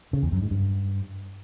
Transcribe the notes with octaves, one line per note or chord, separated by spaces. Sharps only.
C#3
E2
F#2
G#2
G2